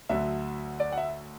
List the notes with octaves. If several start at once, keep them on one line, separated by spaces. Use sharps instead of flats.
D2 D3 F#3 E5
D5
F#5
E5